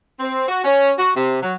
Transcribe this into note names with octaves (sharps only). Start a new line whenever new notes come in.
C4
F#4
C#4
F#4
C3
F#3